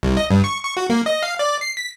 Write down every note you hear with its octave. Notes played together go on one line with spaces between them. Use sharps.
C2
D#5
G2
C#6
C#6
F#4
A#3
D#5
F5
D5
C7
B6